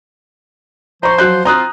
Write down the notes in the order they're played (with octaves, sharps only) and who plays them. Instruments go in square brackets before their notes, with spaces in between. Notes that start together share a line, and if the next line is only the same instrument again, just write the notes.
[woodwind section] F3 C5 [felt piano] A#5 C#6
[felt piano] F#3 F#6 G6
[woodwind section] C4 F4 [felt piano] A#5 D#6 F#6